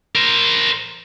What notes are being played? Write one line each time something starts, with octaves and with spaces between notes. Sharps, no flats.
A#4 C5